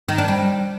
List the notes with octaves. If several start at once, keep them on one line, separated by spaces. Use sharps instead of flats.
D#3
D4
G3